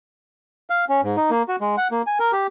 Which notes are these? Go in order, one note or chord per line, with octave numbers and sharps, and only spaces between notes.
F5
C#4
G#2
D#4
A#3
F#4
G#3
F#5
A#3
G#5
A#4
G4